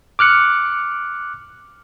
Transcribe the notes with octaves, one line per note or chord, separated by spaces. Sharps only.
D6 F6 F#6 C#7